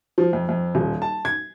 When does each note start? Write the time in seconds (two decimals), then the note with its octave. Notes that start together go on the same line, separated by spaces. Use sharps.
0.18 F3
0.33 F2
0.49 F2
0.75 D#1
1.02 A5
1.25 G#6